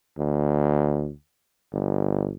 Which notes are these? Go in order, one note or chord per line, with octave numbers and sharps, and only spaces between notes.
D2
G1